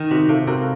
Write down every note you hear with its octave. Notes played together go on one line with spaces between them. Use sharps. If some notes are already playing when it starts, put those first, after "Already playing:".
Already playing: D#3
C3 D#4 F#4
C3 F4 A4
C3 F#4 A#4